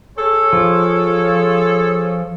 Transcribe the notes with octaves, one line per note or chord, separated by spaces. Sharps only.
G#4 A4 C#5
F3